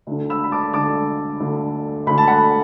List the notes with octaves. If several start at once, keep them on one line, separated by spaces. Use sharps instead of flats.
D2 D3
B5 E6
B5
A5 D6
D2 D3 A5 D6
D2 D3
D2 D3 B5
A5
F#5 B5